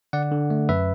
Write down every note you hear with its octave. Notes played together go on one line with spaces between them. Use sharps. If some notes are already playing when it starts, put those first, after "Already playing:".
D3 D5 F#5
D3
A3
F#2 B4 E5